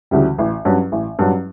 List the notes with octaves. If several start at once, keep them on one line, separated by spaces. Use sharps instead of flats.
D2 C#3 E3 G3
A1
G2 F#3 C#4
A1
G2 F#3 C#4